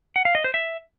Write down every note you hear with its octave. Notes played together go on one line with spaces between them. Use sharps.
F#5
F5
D#5
C5
E5